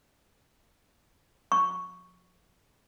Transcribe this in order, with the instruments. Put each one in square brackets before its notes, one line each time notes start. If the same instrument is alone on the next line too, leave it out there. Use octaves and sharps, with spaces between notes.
[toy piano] C#6